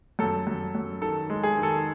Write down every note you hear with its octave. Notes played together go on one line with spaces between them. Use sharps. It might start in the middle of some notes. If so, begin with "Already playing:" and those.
F#2 A4
F#2
F#2
D#3 A4
G#3
G#4
D#3
A4